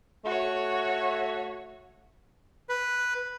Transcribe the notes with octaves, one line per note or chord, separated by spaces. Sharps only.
A3 F#4 C#5
B4